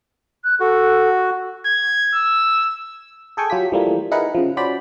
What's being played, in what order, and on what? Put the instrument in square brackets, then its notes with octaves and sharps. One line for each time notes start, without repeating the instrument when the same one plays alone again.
[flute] F#6
[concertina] F#4 [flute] A4
[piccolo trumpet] G#6
E6
[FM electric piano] G#4 A4 G5 G#5 C#6
F#3 F4 G4 B6
E3 F3 G3 A3 A#3
D#4 E4 G#4 A#4 B4 F#5
C#3 F3
C#4 F#4 C5 D5 B5